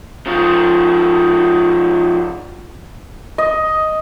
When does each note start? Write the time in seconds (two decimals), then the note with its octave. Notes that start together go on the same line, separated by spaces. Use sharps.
0.27 C#3 F3
3.38 D#5